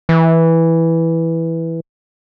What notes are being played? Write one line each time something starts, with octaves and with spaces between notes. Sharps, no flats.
E3